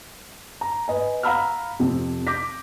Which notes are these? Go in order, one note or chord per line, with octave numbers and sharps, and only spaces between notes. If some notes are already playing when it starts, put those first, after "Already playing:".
A#5
B4 D#5 G#5
F5 F#5 A#5 B5 E6 F6
F2 C3
D6 G6 A#6 B6